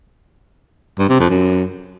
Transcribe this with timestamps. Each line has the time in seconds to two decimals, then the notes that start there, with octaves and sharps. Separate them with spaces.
0.99 G2
1.09 C3
1.20 F2
1.30 F#2